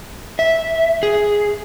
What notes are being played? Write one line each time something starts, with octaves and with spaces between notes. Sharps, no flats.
E5
G#4